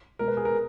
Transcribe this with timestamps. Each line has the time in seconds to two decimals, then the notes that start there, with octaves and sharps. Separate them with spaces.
0.19 B2 G#3 A#4
0.28 B4
0.37 G#4
0.45 A#4